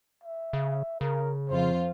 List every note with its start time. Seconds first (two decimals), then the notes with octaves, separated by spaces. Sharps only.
0.24 E5
0.53 C#3
1.01 C#3 A#4
1.49 F2 F4 C5